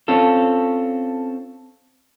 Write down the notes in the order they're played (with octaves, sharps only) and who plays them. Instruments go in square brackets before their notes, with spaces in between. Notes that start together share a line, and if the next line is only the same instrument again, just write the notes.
[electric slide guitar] C4 C#4 F4 A4